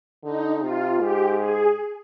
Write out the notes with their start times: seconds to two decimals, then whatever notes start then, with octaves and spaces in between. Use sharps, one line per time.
0.24 D3 D#4
0.62 C3 F4
1.00 G#2 G4
1.39 G#4